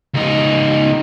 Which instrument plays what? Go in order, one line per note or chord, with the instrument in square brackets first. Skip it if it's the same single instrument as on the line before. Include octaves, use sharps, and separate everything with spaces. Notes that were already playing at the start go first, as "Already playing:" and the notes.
[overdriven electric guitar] C#2 D#4